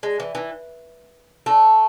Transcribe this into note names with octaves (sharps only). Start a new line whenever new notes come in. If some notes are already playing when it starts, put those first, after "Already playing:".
G#3
E3
E3
A3